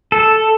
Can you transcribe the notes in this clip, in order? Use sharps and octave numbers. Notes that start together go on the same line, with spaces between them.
A4